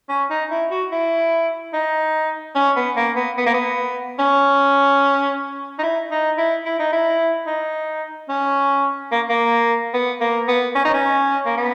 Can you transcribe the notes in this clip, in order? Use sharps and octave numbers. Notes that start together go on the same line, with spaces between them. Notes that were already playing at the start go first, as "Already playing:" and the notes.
C#4
D#4
E4
F#4
E4
D#4
C#4
B3
A#3
B3
B3
A#3
B3
C#4
D#4
E4
D#4
E4
E4
D#4
E4
D#4
C#4
A#3
A#3
B3
A#3
B3
C#4
D#4
C#4
A#3
B3